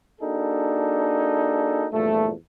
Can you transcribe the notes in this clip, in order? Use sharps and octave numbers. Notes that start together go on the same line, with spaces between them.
A#3 D4 D#4 F#4 G#4 A4
E2 G2 A#2 F3 A3